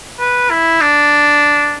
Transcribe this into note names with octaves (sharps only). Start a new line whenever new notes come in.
B4
E4
D4